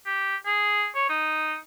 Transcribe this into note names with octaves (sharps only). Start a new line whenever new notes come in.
G4
G#4
C#5
D#4